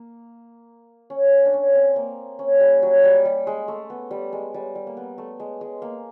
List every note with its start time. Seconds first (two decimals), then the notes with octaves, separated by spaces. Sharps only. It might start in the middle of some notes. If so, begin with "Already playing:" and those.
Already playing: A#3
1.10 C#4
1.45 D4
1.54 C#4
1.75 C4
1.96 A#3
2.39 C#4
2.60 G3
2.83 F#3
3.04 G3
3.25 G3
3.47 G#3
3.68 A3
3.90 B3
4.11 G3
4.33 G#3
4.54 G3
4.75 G3
4.87 A#3
4.97 B3
5.18 A3
5.40 G#3
5.61 G#3
5.82 A#3